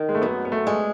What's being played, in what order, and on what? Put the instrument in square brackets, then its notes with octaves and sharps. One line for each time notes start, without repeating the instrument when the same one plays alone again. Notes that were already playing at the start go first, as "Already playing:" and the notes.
Already playing: [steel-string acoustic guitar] D#3
[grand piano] G#3
A3
[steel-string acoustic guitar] F#2 [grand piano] B3
[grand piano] B3
A3
[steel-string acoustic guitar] G#3